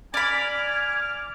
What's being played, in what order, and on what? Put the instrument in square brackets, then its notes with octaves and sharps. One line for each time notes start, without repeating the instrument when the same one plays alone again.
[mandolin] D5 B5 [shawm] G#5 [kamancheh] D6 F6